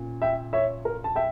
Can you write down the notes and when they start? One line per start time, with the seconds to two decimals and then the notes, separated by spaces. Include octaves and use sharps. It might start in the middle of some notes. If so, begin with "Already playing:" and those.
Already playing: A#2 C#4
0.22 E5 G5
0.53 C#5 E5
0.85 A#4
1.04 A5
1.16 E5 G5